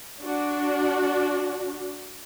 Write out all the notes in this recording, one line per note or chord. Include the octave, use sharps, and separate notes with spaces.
D4 F#4